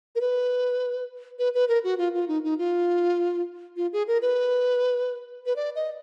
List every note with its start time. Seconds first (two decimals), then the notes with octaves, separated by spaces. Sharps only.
0.15 A#4
0.21 B4
1.39 B4
1.54 B4
1.68 A#4
1.84 F#4
1.98 F4
2.14 F4
2.28 D#4
2.44 D#4
2.58 F4
3.77 F4
3.93 G#4
4.07 A#4
4.22 B4
5.46 B4
5.56 D5
5.75 D#5